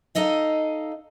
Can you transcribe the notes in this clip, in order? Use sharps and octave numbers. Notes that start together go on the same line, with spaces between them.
D#4 A4 D#5 F5